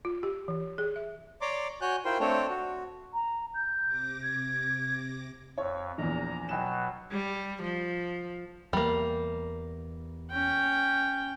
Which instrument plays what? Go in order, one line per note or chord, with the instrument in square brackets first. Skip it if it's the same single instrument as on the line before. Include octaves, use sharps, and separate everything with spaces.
[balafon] F4
G4
E3
G#4
E5
[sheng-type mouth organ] C#5 D5 A#5 C6 D6
F#4 C#5 G#5 F#6 G6
E4 F4 A#4 C5 G5 C6
A3 C4 D4 A4 C5 C#5
F#4
[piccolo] A#5
G6
[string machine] C3 D6 A#6
[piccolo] G#6
[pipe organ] F2 [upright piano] C#5
[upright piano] A#1 E2 [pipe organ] A#5
[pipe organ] B2 F#3 [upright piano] G5 G#5 E7
[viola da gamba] G3
F3
[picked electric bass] E2 [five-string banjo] G3 A#3
[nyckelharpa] C#4 G5